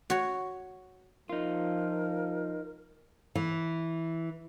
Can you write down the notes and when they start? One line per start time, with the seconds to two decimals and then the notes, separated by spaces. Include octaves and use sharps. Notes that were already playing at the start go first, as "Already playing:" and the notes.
0.10 F#4 C#5
1.29 F3 D#4 F4 A#4
3.35 E3